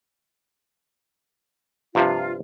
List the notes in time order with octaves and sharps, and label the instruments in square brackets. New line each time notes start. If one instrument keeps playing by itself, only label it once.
[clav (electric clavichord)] G2 C3 F3 [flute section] F4